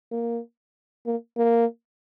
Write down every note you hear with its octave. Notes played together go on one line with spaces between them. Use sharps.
A#3
A#3
A#3